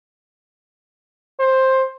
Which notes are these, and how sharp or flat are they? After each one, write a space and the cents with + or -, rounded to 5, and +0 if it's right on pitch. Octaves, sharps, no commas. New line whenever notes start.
C5 +10